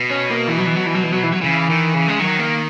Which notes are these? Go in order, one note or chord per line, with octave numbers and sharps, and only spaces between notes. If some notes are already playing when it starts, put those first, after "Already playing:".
Already playing: B2
C#4
A#3
E3
F#3
E3
F#3
E3
F#3
E3
F#3
E3
F#3
C#3 E3
D#3
C#3
G#3
D#3 F#3
A#3